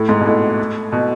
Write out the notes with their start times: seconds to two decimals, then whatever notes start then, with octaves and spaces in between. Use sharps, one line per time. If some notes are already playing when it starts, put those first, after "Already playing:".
Already playing: A2
0.09 G#2
0.21 B2
0.26 A2
0.92 B2